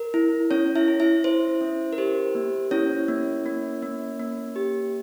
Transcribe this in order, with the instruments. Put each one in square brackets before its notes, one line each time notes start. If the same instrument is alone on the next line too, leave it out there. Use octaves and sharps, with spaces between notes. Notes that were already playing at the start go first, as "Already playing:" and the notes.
Already playing: [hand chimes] A#4
E4
C#4 E4 C#5
E4 E5
E4
E4 E5
E4 C5
C#4
A#4
G4 C5
A#3
C#4 E4 C#5
A#3
A#3
A#3
A#3
G4